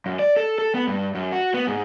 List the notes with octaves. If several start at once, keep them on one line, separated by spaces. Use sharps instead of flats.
F#2
D5
A4
A4
B3
G2
F#2
F#4
B3
G#2